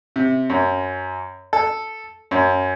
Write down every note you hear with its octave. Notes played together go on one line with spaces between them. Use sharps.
C3
F#2
A4
F#2